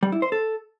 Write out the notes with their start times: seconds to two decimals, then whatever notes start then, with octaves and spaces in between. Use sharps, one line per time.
0.03 G3
0.12 E4
0.22 C5
0.32 A4